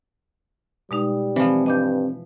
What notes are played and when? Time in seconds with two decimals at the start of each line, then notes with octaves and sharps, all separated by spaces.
0.91 B2 G3 G#3 D#4
1.36 E3 F3 C4
1.66 G2 D#5 D6 G6